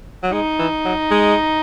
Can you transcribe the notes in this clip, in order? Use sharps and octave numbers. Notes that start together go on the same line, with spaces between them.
F#3
G#3 D#4
E3
F#3
G#3